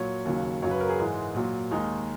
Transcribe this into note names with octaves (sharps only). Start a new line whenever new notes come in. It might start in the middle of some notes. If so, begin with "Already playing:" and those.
Already playing: A#2 F#3 C#5
D#2 C#3 F#3
F#2 C#3 F#3 C#5
B4
A#4
G#4
G#2 E3 G#3
A#2 F#3
D#2 D#3 G#3 D#4